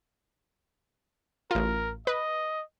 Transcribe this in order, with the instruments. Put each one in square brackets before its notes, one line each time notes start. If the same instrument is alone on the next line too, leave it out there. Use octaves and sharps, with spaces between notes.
[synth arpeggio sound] A1 F4 [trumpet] A#4
[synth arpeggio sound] B4 [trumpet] D#5